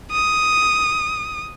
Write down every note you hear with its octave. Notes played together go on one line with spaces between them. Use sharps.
D#6